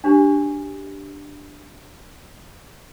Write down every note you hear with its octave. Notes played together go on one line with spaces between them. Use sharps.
D4 F#4 G4 C5